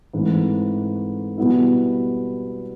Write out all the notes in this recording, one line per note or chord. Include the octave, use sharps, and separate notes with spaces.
G#2 E3 A3 C4
B2 G3 B3 E4